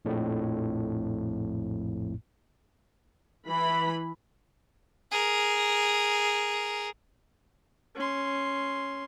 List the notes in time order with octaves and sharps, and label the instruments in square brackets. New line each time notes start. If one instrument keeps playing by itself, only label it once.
[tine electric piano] A#1 F2 A2
[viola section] E3 B5
[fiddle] G#4 A#4
[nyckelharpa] C#4 C6